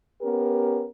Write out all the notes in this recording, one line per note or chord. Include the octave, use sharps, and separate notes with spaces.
B3 C#4 G4 A#4